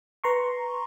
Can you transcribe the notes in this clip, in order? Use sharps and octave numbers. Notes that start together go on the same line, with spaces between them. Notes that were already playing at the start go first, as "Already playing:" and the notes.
B4 A#5 C6 C#6